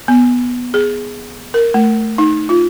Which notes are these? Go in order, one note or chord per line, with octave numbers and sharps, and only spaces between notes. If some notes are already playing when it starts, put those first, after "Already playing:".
B3
G#4
A#4
A3
D#4
F4